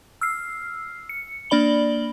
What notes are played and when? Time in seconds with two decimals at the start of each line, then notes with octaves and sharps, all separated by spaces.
0.21 E6 F6 C7
1.09 C#7
1.50 A#3 D4 D5 B5 F#7 G7